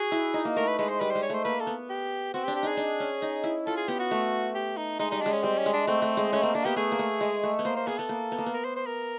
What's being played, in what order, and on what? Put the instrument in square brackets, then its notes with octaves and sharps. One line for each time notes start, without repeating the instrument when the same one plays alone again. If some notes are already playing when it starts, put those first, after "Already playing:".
Already playing: [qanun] F#4 [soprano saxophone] G#4
[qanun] E4
D#4
A#3
[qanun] A3 [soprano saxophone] A#4
[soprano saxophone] B4
[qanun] G#3 [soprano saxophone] B4
[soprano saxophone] C5
[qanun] G3 [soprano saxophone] B4
[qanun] G#3 [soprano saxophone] C5
[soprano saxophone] C#5
[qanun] A3 [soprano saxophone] C5
[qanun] A#3 [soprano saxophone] B4
[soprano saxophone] A4
[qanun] B3
[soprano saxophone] G4
[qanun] C4 [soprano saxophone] F#4
[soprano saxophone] G4
[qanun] D4
[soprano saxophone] G4
[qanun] D#4 [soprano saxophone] G#4
[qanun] D4
C#4
D#4
E4
[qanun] F4 [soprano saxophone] A4
[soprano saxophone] G#4
[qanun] B3 [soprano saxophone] G4
[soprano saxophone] F#4
[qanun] A3
[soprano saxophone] G4
D#4
[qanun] G#3 [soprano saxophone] D#4
[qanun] G3 [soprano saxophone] D#4
[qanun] G#3 [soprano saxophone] D4
[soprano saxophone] C#4
[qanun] G3 [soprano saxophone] C4
[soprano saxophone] C#4
[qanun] G#3
[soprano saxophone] D4
[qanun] A3 [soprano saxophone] C4
[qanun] A3
G#3
[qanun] A3 [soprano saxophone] C#4
[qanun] A#3 [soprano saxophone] C4
[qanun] A#3 [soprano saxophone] D4
[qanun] B3 [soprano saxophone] G4
[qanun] A3 [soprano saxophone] G#4
[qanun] A#3
A3
G#3
A3
B3
[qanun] A#3 [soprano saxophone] C5
[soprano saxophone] C5
[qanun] B3 [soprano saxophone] G#4
[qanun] B3 [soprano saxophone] A4
[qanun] A#3
B3
A#3
B3
[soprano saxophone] A#4
C5
C5
A#4